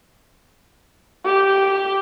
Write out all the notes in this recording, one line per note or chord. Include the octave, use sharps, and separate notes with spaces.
G4